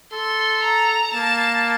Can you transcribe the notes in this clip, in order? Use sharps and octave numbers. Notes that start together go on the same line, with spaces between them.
A4 C6
A#5
A#3 A5